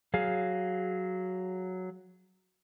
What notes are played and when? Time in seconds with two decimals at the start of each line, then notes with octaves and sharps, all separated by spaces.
0.14 F#3 G#4 F5